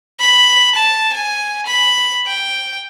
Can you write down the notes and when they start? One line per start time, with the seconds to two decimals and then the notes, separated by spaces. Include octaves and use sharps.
0.20 B5
0.75 A5
1.14 G#5
1.67 B5
2.26 G5